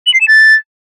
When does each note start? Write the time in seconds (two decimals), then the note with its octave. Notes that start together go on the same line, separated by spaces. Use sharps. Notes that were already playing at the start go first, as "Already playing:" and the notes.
0.07 F#7
0.14 C7
0.21 E7
0.28 A6